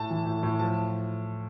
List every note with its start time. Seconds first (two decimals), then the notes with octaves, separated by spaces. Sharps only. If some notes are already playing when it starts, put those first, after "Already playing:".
Already playing: A2 A5
0.10 E3
0.25 A2
0.43 A2
0.59 F3 A5